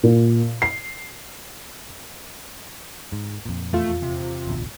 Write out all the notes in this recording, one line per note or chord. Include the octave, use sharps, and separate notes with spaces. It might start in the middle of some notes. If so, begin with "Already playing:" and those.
A#2
C7
G#2
F2 A#2
E2 A3 F4
C3
A1 D2 B2